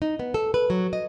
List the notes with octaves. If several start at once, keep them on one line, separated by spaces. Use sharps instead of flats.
D#4
B3
A4
B4
F#3
D#5